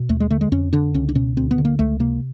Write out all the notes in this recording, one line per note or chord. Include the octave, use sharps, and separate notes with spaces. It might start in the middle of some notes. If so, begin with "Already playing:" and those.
Already playing: B2
D#2 A3
G#3
D3 A3
G#3
F2 C#4
D3 D4
C#2 C#4
D4
B2 C#4
D2 C4
B3
D3
A#3
C#2 A3
C3 A#3